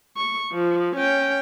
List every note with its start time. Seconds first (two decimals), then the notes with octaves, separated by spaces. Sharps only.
0.17 C#6
0.53 F3
0.96 C#4 G5